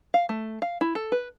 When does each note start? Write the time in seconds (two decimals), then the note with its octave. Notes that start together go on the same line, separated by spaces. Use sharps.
0.14 F5
0.29 A3
0.62 F5
0.81 E4
0.95 A4
1.12 B4